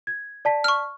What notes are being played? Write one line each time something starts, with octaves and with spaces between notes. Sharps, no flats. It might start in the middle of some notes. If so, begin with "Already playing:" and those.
G#6
D5 A5 B6
C#6 F6